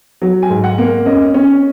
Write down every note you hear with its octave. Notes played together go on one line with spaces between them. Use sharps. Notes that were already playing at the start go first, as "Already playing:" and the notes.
F#3
G#5
G#2
F#5
A#3
C#4 D#5
C#4